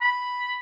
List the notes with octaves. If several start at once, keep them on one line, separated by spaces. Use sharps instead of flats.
B5